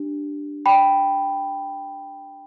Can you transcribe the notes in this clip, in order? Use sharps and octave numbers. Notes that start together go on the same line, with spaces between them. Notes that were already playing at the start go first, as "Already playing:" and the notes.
Already playing: D4 G4
G5 B5